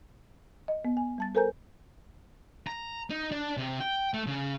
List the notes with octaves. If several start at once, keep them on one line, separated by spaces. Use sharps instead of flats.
D#5
B3
G#5
G3 A5 A6
A4 A#4 C5 G#5 A#5 G6
A#5
D#4
D4
C3
G5
A3
C#3